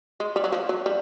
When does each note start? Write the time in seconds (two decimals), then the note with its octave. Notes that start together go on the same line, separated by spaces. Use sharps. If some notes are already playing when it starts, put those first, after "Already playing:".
0.20 G#3
0.36 G3
0.44 F#3
0.52 F3
0.69 F#3
0.86 G3